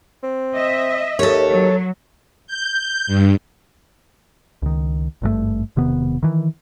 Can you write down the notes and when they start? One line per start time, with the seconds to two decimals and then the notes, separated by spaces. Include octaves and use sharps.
0.23 C4
0.56 D#5 E5
1.19 D#2 A4 C#5
1.51 F#3
2.47 G6
3.07 G2
4.62 C#2 D#3
5.22 G#1 G2 D#3 A3
5.76 E1 C3 D#3 B3
6.23 D#3 E3